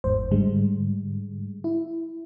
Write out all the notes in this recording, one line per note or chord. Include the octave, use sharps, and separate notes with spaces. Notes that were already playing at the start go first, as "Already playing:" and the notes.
G1 E2 G#2 C5
G#2 D3 G3 G#3
E4